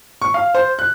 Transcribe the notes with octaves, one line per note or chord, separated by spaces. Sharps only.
C#6
F5
C5
F#6